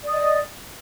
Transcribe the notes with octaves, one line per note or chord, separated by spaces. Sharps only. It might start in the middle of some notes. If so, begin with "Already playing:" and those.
D5 D#5 D#6